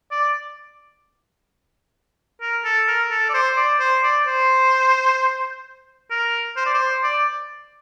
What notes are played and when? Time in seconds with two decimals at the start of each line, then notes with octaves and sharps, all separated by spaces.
0.11 D5
2.41 A#4
2.64 A4
2.88 A#4
3.11 A4
3.30 D5
3.34 C5
3.57 D5
3.79 C5
4.03 D5
4.26 C5
6.10 A#4
6.56 C5
6.66 D5
6.74 C5
7.03 D5